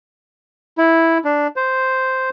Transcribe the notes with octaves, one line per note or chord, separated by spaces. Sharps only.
E4
D4
C5